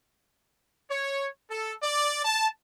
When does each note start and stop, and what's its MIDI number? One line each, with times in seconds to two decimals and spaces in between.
0.90 1.27 73
1.50 1.73 69
1.83 2.23 74
2.25 2.47 81